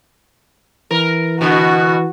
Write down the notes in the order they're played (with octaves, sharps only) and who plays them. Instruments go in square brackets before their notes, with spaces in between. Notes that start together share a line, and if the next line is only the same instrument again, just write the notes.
[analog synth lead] E3 [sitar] A#4
[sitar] B2 D3 [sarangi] F#4